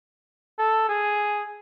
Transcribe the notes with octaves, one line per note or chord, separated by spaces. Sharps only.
A4
G#4